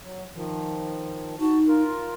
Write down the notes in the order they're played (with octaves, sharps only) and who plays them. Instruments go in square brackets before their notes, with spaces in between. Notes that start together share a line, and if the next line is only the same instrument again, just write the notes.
[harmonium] F#3
D#3 F3
[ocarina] D#4 [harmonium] F#4 A5
[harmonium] F4 A#4